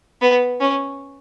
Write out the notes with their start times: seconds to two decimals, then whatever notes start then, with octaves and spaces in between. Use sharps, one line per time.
0.21 B3
0.60 C#4